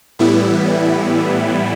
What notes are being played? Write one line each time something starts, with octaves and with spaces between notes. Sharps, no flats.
A2 E3 G3 B3 E4